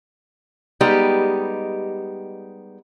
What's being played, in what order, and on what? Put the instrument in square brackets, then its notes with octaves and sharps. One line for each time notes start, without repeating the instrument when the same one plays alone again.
[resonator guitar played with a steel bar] G3 G#3 B3 D#4 G4